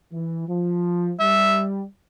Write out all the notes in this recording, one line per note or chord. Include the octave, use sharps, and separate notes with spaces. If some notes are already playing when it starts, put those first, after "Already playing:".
E3
F3
G3 E5